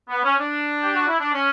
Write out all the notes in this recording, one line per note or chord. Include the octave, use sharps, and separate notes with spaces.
B3
C#4
D4
G4
F#4
E4
D4
C#4